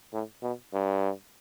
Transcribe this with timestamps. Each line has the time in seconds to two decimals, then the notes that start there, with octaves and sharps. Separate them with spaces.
0.13 A2
0.43 B2
0.74 G2